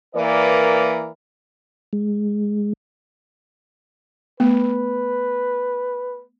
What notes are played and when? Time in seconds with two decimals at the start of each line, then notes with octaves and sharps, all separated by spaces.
0.15 E3 A#3 A#4 B4 D5
1.93 G#3
4.40 A3 B3 B4